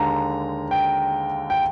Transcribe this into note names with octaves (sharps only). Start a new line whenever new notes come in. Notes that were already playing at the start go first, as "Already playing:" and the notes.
Already playing: D#2 D3 G#3 A#5
G5
G5